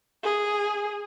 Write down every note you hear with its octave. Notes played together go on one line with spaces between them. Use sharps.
G#4